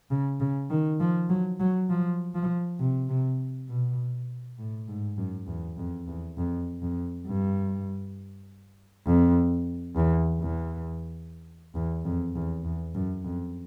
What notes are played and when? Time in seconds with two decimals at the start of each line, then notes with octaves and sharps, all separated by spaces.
0.11 C#3
0.40 C#3
0.70 D#3
1.00 F3
1.29 F#3
1.60 F#3
1.90 F3
2.35 F3
2.79 C3
3.09 C3
3.69 B2
4.58 A2
4.88 G#2
5.18 F#2
5.47 E2
5.78 F2
6.08 E2
6.37 F2
6.82 F2
7.27 G2
9.06 F2
9.96 E2
10.40 E2
11.75 E2
12.05 F2
12.35 E2
12.64 E2
12.95 F#2
13.24 F2